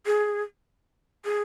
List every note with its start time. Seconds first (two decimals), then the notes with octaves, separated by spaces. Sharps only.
0.06 G#4
1.25 G#4